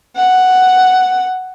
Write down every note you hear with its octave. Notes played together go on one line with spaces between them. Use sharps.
F#5